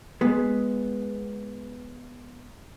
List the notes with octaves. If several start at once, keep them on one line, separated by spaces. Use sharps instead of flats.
G#3 B3